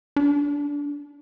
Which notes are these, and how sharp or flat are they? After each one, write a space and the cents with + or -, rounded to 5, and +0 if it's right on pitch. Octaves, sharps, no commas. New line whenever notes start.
D4 -20